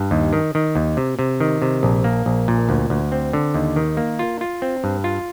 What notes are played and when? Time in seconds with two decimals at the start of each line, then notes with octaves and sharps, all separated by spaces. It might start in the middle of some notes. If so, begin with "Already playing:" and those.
Already playing: G2
0.11 D#2
0.33 D#3
0.55 D#3
0.75 D#2
0.97 C3
1.19 C3
1.40 D#3
1.62 C3
1.83 A#1
2.04 A#3
2.26 A#1
2.48 A#2
2.69 D2
2.90 D2
3.12 C4
3.33 D3
3.54 D#2
3.76 D#3
3.97 A#3
4.19 F4
4.41 F4
4.62 C4
4.84 G2
5.04 F4